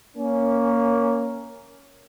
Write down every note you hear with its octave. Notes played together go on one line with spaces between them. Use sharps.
A#3 C#4